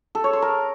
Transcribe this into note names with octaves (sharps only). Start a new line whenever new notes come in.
A4
C#5
C6
A#4